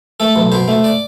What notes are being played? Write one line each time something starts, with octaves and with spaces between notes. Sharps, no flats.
A3 A4
B1
B2 C5
A3
D5